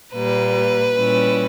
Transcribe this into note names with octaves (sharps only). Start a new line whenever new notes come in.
A#2 G3 A#3 B4
A#2 G3 C#4 E4